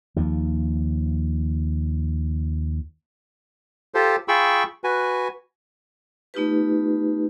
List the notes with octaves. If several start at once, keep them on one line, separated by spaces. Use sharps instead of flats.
D#2 F3
F4 G4 A4 C5
F4 G#4 G5 B5 C#6 E6
F#4 B4 G#5
A3 B3 D#4 F4 G4 B4